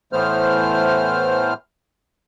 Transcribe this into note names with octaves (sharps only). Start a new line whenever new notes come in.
A2 E3 A3 B3 C5 F6